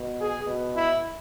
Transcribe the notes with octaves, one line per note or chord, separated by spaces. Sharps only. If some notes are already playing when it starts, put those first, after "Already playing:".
Already playing: B2
G#4
B2
E4